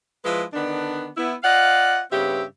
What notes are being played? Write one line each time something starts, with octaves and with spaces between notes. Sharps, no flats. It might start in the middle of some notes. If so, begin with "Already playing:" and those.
F3 G#3 E4 B4
D3 D#3 B3 D4
B3 E4
F4 D5 D#5 F5 F#5
G2 C#3 B3 C4 G4 E5